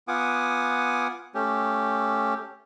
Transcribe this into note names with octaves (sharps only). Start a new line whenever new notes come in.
B3 F4 F#5 G#5 D6 D#6
A3 C#4 G4